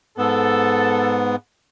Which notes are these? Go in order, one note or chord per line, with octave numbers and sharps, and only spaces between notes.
G#2 B3 A4